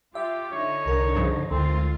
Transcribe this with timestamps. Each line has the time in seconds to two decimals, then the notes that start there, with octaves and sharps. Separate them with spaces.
0.15 F4 G4 E5
0.52 D3 D#4 C#5
0.86 C2 A#4
1.16 G2 C#3 F3
1.51 D2 D#3 G#3 C4 F4